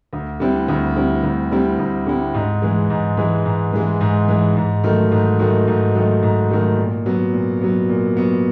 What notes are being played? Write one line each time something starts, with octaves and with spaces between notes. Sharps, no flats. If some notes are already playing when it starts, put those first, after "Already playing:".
D2
D3 G3 C4 E4
D2
D3 G3 C4 E4
D2
D3 G3 C4 E4
D2
D3 G3 C4 E4
G#2
E3 G#3
G#2
E3 G#3
G#2
E3 G#3
G#2
E3 G#3
G#2
D#3 F#3 A3
G#2
D#3 F#3 A3
G#2
D#3 F#3 A3
G#2
D#3 F#3 A3
A#2
F#3 B3
A#2
F#3 B3
A#2
F#3 B3